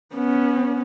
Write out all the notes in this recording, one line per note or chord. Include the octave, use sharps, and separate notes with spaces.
B3 C#4